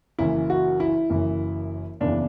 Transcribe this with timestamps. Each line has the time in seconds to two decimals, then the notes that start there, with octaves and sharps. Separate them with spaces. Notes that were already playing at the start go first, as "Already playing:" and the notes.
0.19 F#1 F#2 E3 E4
0.50 F#4
0.80 E4
1.10 F#1 F#2 E3
2.00 F#1 E2 C#3 E3 D4